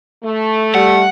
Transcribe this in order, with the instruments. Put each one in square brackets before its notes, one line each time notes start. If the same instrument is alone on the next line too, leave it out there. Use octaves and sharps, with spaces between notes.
[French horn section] A3
[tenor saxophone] G3 [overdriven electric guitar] F#5